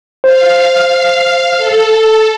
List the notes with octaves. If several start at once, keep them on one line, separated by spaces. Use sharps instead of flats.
C5 F5
A4